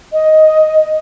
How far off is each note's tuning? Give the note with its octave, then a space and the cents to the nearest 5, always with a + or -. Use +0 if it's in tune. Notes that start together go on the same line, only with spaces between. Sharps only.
D#5 +5